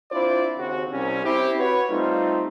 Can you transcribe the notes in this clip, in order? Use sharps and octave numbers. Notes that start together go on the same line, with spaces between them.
C4 D4 E4 F4 C5 D5
D#2 C#3 C4 F#4
C2 C#4
C4 E4 G4
F#4 B4 C#5
G3 A3 C4 D#4 F4